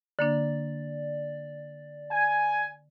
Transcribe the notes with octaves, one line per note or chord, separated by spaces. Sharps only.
D3 A#3 D4 D5
G#5